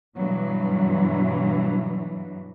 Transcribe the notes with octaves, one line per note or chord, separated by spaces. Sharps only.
G2 B2 E3 F#3